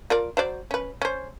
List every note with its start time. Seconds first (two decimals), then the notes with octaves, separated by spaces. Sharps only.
0.10 F4 A#4 D5
0.37 F#3 C5 D5
0.71 C#4 B4
1.02 C#4 C5